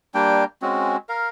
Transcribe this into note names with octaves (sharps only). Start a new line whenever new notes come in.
G3 A#3 D4 G5
G#3 C4 C#4 F#4
A#4 F5